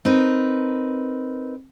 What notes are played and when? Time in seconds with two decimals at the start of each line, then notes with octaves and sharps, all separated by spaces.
0.05 C4 D#4 A#4 B4